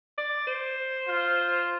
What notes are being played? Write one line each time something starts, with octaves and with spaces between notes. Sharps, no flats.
D5
C5
F4